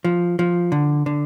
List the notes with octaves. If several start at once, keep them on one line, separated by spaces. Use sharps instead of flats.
F3
F3
D3
D3